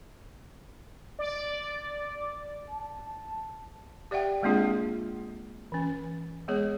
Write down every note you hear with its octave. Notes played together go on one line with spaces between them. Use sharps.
D5
A5
G4 D5 E5 F#5 G5
G#3 A#3 C4 D4 F4 G#4
E3 C#4
G#3 B3 G#4 C#5